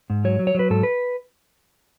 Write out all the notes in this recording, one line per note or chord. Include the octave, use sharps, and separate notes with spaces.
G#2
F#3 C#5
F#3
C#5
F#3 B4
G#2 A4
B4